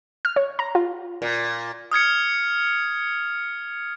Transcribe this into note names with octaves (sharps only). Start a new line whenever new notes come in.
F6
C#5
A#5
F4
A#2
D#6 F6 G#6 C#7